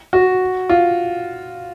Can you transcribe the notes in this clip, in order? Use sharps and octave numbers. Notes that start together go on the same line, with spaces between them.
F#4
F4